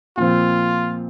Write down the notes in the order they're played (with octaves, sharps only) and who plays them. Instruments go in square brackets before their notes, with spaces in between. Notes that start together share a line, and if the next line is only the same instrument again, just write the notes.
[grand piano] A#2 F3 C4 [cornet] F4